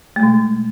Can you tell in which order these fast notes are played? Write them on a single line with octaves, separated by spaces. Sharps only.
A3 G#3 B2